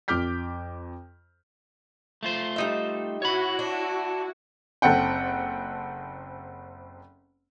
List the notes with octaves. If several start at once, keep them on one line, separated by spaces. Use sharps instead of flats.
F2 D6 F6 G6 B6
A3 F4 C5
G3 D#4 E5
E4 F#4 C#5 B5
D4
F#1 C4 A4 F#5 G5